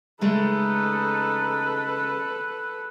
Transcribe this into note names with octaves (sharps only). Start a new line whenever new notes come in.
C#3 G#3 A3 D#4 A4 B4